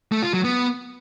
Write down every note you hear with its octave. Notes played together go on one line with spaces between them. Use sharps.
A3
F4
F#3
B3